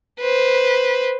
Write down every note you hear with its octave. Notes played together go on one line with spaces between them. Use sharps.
B4 C5